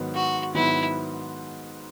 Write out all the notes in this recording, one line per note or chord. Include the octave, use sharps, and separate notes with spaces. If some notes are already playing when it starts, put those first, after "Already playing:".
Already playing: G#2 D#3 F#3 B3
F#4
G#2 D#3 F#3 B3 E4